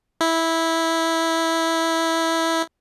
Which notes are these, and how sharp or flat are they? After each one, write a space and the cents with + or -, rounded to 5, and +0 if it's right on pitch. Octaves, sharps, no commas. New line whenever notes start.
E4 -10